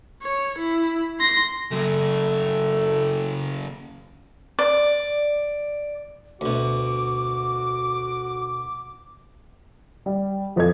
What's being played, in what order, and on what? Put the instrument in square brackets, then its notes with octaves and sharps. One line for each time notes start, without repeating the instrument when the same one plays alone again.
[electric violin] C#5
E4
C6 A#6
[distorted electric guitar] C#3 F#3 [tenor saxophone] A3
[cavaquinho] D5
[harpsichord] D2 B2 [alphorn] F#4 [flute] D6
[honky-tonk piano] G3
F2 F3 A4 D#5 G#6